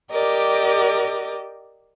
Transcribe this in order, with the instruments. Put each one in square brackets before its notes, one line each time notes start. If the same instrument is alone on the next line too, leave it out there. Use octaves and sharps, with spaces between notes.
[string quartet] G4 A#4 D5 D#5